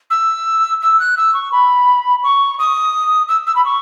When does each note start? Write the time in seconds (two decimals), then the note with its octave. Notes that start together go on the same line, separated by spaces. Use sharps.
0.10 E6
0.82 E6
0.99 F#6
1.17 E6
1.34 C#6
1.52 B5
2.24 C#6
2.59 D#6
3.29 E6
3.47 E6
3.56 B5
3.65 C#6